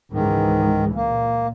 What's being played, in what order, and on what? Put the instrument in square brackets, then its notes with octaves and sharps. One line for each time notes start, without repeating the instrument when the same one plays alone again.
[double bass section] C#2 G#2 E3 [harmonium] D#3
[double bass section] A#2 [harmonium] A#3